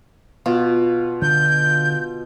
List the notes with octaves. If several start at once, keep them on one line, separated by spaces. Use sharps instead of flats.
B2 F4
D3 G6